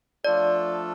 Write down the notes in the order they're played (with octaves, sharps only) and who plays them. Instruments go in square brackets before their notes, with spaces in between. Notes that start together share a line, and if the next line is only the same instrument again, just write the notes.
[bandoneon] F3 A3 D4 F4 A4 [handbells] D5